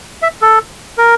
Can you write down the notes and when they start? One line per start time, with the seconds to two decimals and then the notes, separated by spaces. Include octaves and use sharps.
0.22 E5
0.42 A4
0.98 A#4